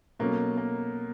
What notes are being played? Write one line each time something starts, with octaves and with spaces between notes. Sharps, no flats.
B2 F#3 A3 A#3 C#4
A#3